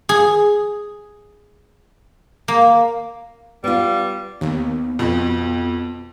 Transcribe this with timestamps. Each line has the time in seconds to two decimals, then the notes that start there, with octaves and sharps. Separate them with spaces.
0.09 G#4
2.48 A#3
3.64 G3 B3 F4
4.41 D#2 B3
4.99 F2 B2